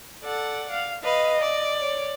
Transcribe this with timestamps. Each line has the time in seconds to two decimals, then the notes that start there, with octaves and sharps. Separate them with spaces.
0.24 A4 D5 F#5
0.71 F5
1.03 B4 D#5 F5
1.41 D5
1.80 C#5